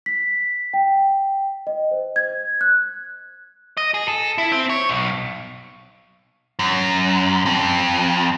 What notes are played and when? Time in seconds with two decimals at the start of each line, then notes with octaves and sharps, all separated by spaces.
0.06 B6
0.74 G5
1.67 D#5
1.91 C5
2.16 G#6
2.61 F#6
3.77 D#5
3.94 G#4
4.08 A4
4.38 E4
4.52 C4
4.70 C#5
4.89 B1
6.59 F#2
7.46 F2